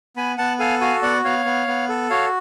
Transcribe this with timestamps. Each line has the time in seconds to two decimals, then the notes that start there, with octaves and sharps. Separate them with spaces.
0.16 B3 G#5 B5
0.38 B3 F#5 A5
0.59 A4 F5 G#5
0.81 F#4 F5 G#5
1.02 B3 D5 F#5
1.24 B3 C#5 F5
1.45 B3
1.68 B3
1.89 A4
2.10 F#4 C#5 F5